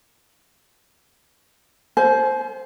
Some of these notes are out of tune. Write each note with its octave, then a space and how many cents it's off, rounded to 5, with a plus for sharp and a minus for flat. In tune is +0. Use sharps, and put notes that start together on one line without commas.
C5 +0 G#5 +45